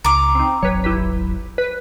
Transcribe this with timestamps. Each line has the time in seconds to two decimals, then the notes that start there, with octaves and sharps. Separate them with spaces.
0.05 C#2 A#5 D6
0.35 C4 D#4
0.63 D#1 G#1 F#3 B4 C#5
0.84 E4 G4 B4
1.58 B4